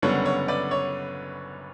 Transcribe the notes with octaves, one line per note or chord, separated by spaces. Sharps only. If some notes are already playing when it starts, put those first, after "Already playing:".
F#1 F#2 D3 G3 B3 C#5
C#5
B4 D5
C#5